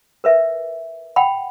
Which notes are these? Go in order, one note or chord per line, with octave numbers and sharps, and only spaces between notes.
A#4 B4 E5
F#5 G5 B5